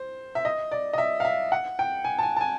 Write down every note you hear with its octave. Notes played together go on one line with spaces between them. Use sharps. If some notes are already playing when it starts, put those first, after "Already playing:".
Already playing: C5
E5
D#5
D5
D#5
E5
F5
E5
F#5
G5
G#5
A5
G#5
A5
G#5